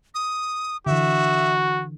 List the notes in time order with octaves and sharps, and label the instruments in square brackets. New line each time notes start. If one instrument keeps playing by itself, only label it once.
[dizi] D#6
[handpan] D3 E3 [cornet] F#4 [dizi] E5